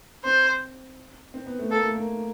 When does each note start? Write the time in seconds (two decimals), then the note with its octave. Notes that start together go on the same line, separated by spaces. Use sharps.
0.24 C4 C5
1.34 C4
1.46 B3
1.59 A3
1.71 A#3 A4
1.84 A3
1.96 A#3